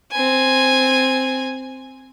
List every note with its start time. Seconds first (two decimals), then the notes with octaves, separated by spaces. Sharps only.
0.11 C4 G#5